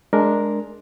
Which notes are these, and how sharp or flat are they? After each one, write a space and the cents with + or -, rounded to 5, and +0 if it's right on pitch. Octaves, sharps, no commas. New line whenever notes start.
G#3 +15 D4 +0 A#4 +0